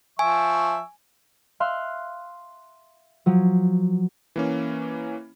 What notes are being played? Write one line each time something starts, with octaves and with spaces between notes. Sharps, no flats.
F3 E5 G#5 C#6
E5 F5 C6 F6 F#6
F3 F#3
E3 A#3 C#4